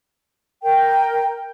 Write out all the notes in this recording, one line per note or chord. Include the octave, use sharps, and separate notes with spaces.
A#4 G5